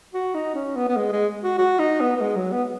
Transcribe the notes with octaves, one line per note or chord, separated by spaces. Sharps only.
F#4
D#4
C#4
B3
B3
G#3
G#3
F#4
F#4
D#4
B3
B3
G#3
F#3
B3